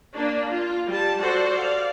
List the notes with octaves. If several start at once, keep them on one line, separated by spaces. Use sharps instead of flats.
A#3 D4
F4
G3 A5
F#4 A4 C5 D5 F#5
D5 F5